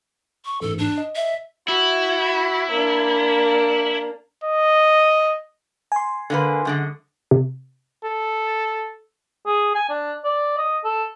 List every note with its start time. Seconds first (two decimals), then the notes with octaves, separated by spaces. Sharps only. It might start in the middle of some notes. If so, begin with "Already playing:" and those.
0.45 C#6
0.61 A1 F2 G#2 A4
0.78 D4
0.98 D#5
1.16 E5
1.68 E4 F#4
2.71 A#3 D4
4.43 D#5
5.92 G#5 C6
6.30 D3 A#3 B4
6.65 F#2 D3 G#3
7.31 C3
8.04 A4
9.46 G#4
9.75 G#5
9.89 D4
10.24 D5
10.58 D#5
10.84 A4